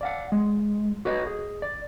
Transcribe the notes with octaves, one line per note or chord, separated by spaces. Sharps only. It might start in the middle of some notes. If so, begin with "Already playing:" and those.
D5 F5 F#5
G#3
F#4 B4 C#5 D#5
G#4
D5